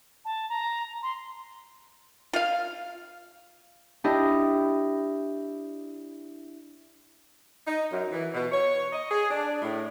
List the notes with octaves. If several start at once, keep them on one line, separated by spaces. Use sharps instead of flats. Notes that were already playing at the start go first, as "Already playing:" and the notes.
A5
A#5
C6
F4 F5
D4 E4 G4 D#5
D#4
F#2
E3
B2
C#5
D#5
G#4
D4
A2